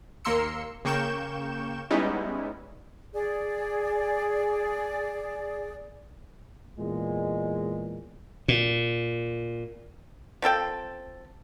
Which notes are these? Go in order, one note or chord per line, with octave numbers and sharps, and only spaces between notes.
D#2 A#3 A#4 C6 E6 C#7
C#3 A#3 G5 C#6 G6 E7
G3 G#3 B3 C#4 D#4 E4
G#4 D5
E2 A#2 G#3
A#2
F3 C4 A4 G5